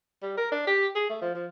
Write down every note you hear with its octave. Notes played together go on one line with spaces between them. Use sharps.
G3
A#4
D4
G4
G#4
A3
F3
F3